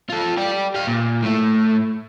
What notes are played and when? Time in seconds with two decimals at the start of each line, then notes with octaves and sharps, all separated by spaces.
0.10 F4 A4
0.37 G4 D5
0.75 G4 F5
0.87 A#2
1.22 A2 A3